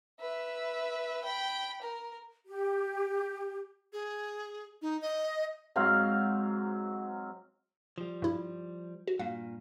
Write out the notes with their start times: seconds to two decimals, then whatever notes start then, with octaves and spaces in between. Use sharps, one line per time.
0.21 B4 E5
1.24 G5 B5
1.82 A#4
2.47 G4
3.93 G#4
4.82 D#4
5.02 D#5
5.76 G#2 F#3 C4 F5
7.98 F3 G3
8.22 G2 E4
9.07 F#4
9.19 G2 A#2 F5